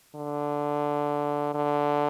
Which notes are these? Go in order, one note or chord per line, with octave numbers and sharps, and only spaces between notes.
D3
D3